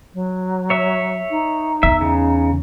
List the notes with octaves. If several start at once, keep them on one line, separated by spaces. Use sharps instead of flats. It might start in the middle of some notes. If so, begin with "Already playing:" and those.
F#3
C#5 E5
D#4
E2 E5
C#3